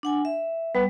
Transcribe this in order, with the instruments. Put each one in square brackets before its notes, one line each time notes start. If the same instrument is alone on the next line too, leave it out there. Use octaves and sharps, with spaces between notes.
[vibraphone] D4 F#5 G#5
E5
[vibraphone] G3 [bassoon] B3